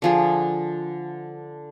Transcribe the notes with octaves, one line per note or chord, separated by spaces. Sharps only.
D3 F3 G#4